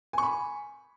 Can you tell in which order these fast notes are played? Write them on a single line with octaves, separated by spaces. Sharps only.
G#5 C#6 B5